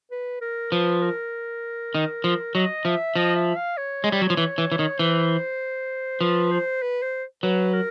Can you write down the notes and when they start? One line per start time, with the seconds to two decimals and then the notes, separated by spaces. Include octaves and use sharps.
0.11 B4
0.41 A#4
0.72 F3 B4
1.02 A#4
1.95 D#3
2.24 F3
2.55 F#3 D#5
2.85 F3 E5
3.16 F3 D#5
3.36 E5
3.56 F5
3.77 C#5
4.04 G#3
4.12 G3
4.22 F#3
4.30 F3
4.37 E3
4.58 E3
4.72 E3
4.79 D#3
4.99 E3 C5
6.21 F3 B4
6.51 C5
6.82 B4
7.02 C5
7.43 F#3 B4
7.73 A#4